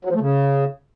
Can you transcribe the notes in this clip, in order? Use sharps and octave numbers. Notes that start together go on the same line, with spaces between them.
F#3
F3
A3
C#3